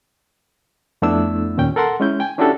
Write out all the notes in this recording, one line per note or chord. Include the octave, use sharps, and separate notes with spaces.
F2 A3 B3 D4 E4 E6
D#2 A#2 C#4 G5
A4 A#4 F#5 C6
G#3 C#4 E4 G6
G5 G#5
C#4 D4 E4 F#4 G4 A4